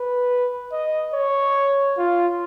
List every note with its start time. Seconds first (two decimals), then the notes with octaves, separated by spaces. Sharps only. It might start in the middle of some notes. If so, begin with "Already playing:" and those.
Already playing: B4
0.72 D#5
1.14 C#5
1.98 F4